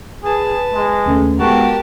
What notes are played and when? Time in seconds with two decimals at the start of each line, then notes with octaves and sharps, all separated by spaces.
0.23 G#4 B4 A5
0.73 G#3
1.06 D#2 C#3 A3
1.39 G#3 B3 F#4 G4 A#4 A5